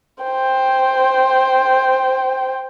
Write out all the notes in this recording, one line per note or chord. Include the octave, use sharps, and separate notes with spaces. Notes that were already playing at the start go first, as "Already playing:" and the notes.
C5 G5